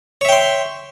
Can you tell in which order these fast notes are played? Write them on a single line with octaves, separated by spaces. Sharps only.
C#5 E5 G5 C6